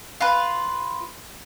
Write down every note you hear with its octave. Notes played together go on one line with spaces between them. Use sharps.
F4 B4